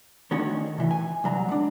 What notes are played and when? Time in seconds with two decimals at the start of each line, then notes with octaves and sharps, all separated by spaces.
0.31 D#3 A3 C#4 D4 F#4 C#5
0.78 C3 E3
0.91 G#5
1.24 C2 F#3 A#5
1.49 G#3 D4